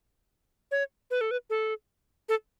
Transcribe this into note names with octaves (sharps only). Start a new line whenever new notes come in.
C#5
B4
A4
B4
A4
A4